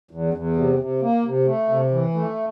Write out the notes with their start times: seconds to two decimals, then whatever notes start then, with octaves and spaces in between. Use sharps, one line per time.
0.11 E2
0.34 E2
0.56 C3
0.79 C3
1.02 A#3
1.24 C3
1.47 A3
1.69 C3
1.91 E3
2.14 A3